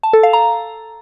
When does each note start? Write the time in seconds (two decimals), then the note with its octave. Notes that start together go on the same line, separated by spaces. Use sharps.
0.03 A5
0.13 A4
0.23 F5
0.33 A#5